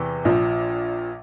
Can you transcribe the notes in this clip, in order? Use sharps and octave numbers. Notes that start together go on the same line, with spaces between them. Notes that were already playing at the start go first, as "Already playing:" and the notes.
Already playing: E2 C3 E3
A#1 A#2 F3